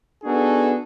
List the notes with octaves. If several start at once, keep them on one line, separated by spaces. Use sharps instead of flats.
B3 D4 D#4 F#4 G#4 A4